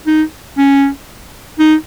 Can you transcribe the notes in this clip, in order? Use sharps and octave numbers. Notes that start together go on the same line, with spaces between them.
D#4
C#4
D#4